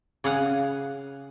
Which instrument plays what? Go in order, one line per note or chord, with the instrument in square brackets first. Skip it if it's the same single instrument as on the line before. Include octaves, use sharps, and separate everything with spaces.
[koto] C#3 G#4 F5 F#5